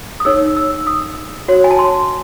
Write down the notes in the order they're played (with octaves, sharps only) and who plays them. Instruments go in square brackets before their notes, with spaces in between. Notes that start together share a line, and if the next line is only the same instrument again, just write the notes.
[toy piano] D#6
D#4 G#4 C#5 E6
E6
D#6
F#4 C#5
G#5
A5
C6